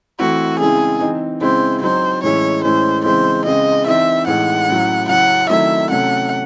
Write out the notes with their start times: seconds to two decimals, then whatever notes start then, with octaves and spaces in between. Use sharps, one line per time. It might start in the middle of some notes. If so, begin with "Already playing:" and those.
0.19 E3 A3 C4 E4 F#4
0.59 C#3 G#3 C4 E4 G#4
1.01 E3 C4 D#4
1.41 C#3 G#3 C4 E4 C5
1.82 F#3 C4 D#4 C5
2.23 A2 E3 G#3 C#4 E4 C#5
2.64 A2 E3 G#3 C#4 E4 C5
3.04 C#3 E3 G#3 C4 E4 C5
3.45 C#3 G#3 C4 D#5
3.86 E3 C4 D#4 E5
4.27 A2 E3 G#3 D#4 F#5
4.69 A2 F#3 C#4 E4
5.08 C#3 F#3 C#4 E4 F#5
5.49 D#3 F#3 A3 C4 E4 E5
5.90 C3 F#3 A3 C#4 F#5